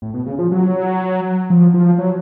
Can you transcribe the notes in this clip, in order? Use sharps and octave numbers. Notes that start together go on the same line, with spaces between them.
A2
B2
C#3
F3
F#3
F3
F3
F#3